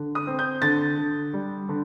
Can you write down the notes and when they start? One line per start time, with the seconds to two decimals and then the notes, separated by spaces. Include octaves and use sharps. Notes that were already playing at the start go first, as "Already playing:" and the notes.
Already playing: D3
0.15 D#6
0.27 C4
0.39 G6
0.62 D3 A6
0.98 D3
1.33 G3
1.69 D3